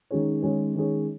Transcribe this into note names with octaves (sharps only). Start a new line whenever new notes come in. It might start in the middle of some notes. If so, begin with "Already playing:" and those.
D#3 G#3 C#4 G#4 C#5
D#3 G#3 C#4 G#4 C#5
D#3 G#3 C#4 G#4 C#5